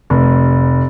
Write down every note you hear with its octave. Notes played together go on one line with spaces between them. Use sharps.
F1